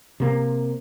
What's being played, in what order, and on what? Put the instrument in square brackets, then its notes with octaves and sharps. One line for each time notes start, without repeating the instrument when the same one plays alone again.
[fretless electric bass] C3 A#3